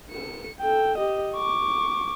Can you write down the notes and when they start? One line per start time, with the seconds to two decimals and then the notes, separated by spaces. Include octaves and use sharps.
0.12 C#7
0.61 A4 G5
0.98 G4 D#5
1.34 C#6 D6